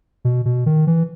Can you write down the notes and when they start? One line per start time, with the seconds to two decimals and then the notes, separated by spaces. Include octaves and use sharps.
0.25 B2
0.45 B2
0.66 D#3
0.87 E3